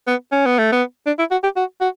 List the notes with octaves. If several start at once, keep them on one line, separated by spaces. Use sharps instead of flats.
B3
C#4
B3
A3
B3
D4
E4
F#4
G4
F#4
F#4